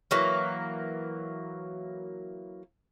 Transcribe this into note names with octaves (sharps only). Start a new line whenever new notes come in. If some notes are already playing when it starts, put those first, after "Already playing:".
E3 F#3 A#3